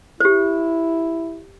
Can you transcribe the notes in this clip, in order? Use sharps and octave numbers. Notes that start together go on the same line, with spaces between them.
E4 G4 C5